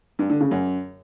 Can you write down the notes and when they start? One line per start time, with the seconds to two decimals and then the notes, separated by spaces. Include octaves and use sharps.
0.19 G2
0.30 D3
0.40 C#3
0.51 F#2